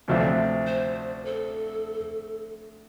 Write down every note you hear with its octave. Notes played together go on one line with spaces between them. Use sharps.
D2 C3 F3 A3 D4
C5
A4